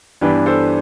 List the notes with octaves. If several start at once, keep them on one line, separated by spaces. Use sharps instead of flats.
G2 E3 B3 D4 G4 B4
A4 C5